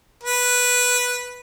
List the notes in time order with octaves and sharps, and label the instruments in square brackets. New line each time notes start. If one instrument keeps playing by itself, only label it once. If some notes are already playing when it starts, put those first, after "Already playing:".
[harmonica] B4